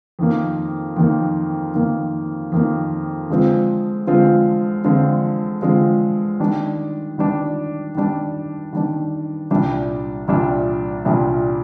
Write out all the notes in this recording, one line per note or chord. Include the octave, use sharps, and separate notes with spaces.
F2 D#3 A#3
F2 D#3 A#3
F2 D#3 A#3
F2 D#3 A#3
D3 F3 G#3 C4 F4
D3 F3 G#3 C4 F4
D3 F3 G#3 C4 F4
D3 F3 G#3 C4 F4
D#3 G3 D4
D#3 G3 D4
D#3 G3 D4
D#3 G3 D4
C2 A#2 G3 D4
C2 A#2 G3 D4
C2 A#2 G3 D4